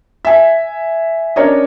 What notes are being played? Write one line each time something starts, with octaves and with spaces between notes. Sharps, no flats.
E5 G#5
C#4 D4 A#4 C#5 D#5